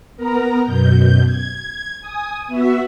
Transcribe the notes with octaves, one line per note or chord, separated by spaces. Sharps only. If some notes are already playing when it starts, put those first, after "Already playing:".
B3 A#4 A#5
F#2 B2 G6
G#6
G#5 D#6
B3 F#4 E5